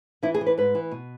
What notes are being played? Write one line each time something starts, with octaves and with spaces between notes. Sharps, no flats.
E3 E4
G#4
E3
B4
G#2 B4
E3
B2